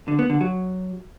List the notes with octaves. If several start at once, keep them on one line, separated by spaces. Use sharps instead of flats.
D3
B3
D3
F#3